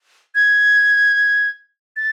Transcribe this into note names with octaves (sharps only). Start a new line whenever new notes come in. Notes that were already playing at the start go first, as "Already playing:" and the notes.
G#6
A6